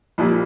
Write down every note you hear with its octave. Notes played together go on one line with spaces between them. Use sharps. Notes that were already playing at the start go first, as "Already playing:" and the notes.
A#1 A#2 G3 A#3